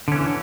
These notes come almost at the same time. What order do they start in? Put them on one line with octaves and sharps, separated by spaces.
D3 C#4 E3